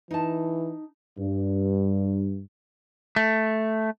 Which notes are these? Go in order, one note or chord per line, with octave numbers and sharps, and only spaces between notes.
E3 D#4 A5
G2
A3